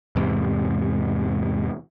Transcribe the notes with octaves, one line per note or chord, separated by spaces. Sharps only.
E2 G#2 C3